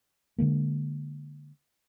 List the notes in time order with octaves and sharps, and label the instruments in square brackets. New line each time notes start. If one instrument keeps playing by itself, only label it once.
[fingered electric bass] D3 E3 G#3 A#3